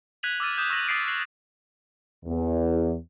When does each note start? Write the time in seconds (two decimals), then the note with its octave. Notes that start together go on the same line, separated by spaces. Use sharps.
0.23 F#6 G#6 B6 D#7 F7 F#7
0.40 D6 E6 F6 A6 D#7
0.57 D6 D#6 G6 E7
0.70 C#6 E6 G6 A#6 F7 F#7
0.88 D#6 A6 B6 C7 D7
1.07 F#6 C7 F#7
2.25 E2